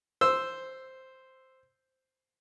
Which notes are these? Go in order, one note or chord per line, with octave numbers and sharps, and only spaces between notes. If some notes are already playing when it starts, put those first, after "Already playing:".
C5 E6